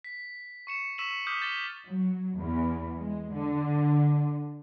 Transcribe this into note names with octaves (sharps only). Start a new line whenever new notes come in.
B6
C#6 C#7 E7
C#6 E6 B6 D#7 E7 F#7
D6 D#6 F6 G6 B6
F6 G6 A6 B6 E7 G7
F#3
E2
G#3
D3